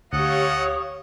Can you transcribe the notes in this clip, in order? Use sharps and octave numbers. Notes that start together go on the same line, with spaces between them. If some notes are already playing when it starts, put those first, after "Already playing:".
D2 G4 A4 C#5 D#5 F5 F#5 D#6